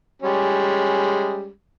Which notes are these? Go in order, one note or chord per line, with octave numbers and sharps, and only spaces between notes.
G3 G#3 C#4